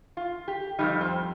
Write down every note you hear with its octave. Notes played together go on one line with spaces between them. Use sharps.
F4
G4
F2 C3 G3 D#4
C4